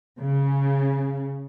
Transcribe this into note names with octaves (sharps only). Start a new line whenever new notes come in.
C#3